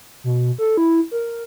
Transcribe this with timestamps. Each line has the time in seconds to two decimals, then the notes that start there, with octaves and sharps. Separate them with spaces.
0.24 B2
0.58 A4
0.77 E4
1.11 A#4